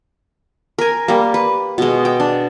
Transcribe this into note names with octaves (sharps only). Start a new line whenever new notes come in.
A#4 G#5
G3 A#3
B4
B2 G#3
G5
D4